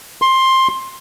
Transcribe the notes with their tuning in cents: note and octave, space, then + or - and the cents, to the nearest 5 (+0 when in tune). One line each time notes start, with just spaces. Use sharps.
C6 +15